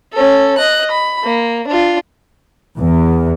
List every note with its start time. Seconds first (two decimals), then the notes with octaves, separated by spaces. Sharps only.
0.13 C#4 A4
0.58 D#5 F#6
0.91 B5
1.24 A#3
1.68 D4 F4
2.77 E2